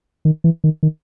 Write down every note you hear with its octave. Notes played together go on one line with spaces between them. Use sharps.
D#3
E3
D#3
D#3